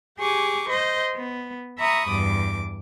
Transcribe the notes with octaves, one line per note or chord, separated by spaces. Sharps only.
G4 G#4 C#6 D6
C5 D#5 G6
B3
E5 A#5 B5 C#6 D#6
E2 G2 D6